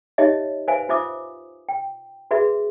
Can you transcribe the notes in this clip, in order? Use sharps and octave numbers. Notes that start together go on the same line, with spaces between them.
D#4 G4 C#5 D#5 E5
B4 C5 E5 F5 G#5
F4 C5 E5 D6 D#6
G5
F#4 G#4 B4 E5